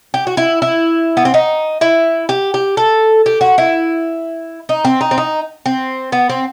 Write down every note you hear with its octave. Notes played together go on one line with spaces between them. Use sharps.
G4
F#4
E4
E4
B3
C4
D#4
E4
G4
G4
A4
G4
F#4
E4
D#4
C4
D#4
C4
D#4
C4
B3
C4